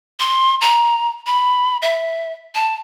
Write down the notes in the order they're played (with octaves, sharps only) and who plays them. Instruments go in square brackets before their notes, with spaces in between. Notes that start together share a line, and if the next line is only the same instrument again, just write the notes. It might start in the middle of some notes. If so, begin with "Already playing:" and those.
[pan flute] C6
A#5
B5
E5
A5